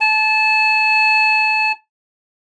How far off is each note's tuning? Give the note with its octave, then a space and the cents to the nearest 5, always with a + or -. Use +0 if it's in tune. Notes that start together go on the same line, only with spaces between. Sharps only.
A5 -25